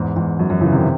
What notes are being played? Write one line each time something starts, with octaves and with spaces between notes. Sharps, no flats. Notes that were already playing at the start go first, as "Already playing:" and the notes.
Already playing: E2 G#2
E2 G#2
F#2
F#2
C#3 E3
C3 D#3